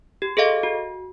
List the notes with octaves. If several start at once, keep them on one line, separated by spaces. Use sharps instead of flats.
G4
G#4 A4 D#5 F5
F#4